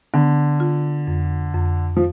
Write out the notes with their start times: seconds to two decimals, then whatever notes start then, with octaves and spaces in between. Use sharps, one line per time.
0.14 D3 B3
0.60 F4
1.08 F2
1.54 F2
1.97 F3